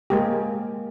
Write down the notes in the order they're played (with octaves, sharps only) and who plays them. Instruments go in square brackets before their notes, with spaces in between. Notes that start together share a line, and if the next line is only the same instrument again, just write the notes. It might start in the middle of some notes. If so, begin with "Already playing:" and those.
[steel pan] G#3 A#3 G4